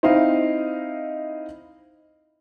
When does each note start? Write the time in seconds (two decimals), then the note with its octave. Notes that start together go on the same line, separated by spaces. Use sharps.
0.03 C4 D#4 E4 D#5 F5